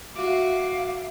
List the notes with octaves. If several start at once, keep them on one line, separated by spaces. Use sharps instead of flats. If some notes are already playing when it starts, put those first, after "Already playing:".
F#4 E5 F5 D6